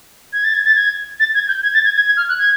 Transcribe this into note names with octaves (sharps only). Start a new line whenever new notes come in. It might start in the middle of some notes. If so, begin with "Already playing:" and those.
G#6
A6
G#6
A6
G#6
A6
G#6
G6
G#6
A6
G#6
G#6
G#6
F6
F#6
G#6